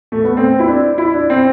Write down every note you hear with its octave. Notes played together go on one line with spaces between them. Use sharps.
A3
B3
C4
E4
D4
E4
D4
C4